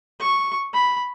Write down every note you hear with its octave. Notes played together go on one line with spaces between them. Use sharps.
C#6
B5